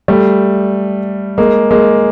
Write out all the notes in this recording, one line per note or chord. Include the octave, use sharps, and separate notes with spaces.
G3 A3
G#3 A#3
G#3 A#3